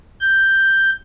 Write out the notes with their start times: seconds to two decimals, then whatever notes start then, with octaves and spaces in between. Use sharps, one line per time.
0.21 G6